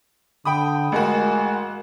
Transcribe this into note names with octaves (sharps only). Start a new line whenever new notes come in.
D3 G5 B5 D#6
A1 G#3 A#3 F#4